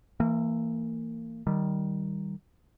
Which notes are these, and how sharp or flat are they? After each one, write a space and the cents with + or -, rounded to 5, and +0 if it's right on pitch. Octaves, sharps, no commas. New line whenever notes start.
E3 +0 A#3 -35
D#3 +0 G3 -10